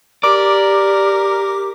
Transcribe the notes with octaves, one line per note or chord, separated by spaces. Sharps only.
G4 A#4 D5 D6